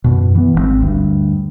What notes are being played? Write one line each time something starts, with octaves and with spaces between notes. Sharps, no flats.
F#2 B2
E3 B3
G#1 D#3 C4
D2 G2